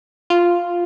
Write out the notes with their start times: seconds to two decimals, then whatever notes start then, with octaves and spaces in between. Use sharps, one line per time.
0.30 F4